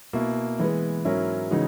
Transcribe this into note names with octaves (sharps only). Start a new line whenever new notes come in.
B2 A#3 E4
E3 G#3 B3
G#2 F#3 C#4 E4 A#4
C#3 E3 G#3 D#4 F#4